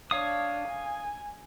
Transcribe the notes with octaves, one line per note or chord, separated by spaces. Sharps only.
D4 C#5 F5 D#6
G#5